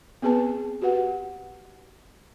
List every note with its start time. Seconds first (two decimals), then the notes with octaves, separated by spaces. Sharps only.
0.22 B3 C4 G#4 B4 A5
0.82 F#4 G4 B4 F#5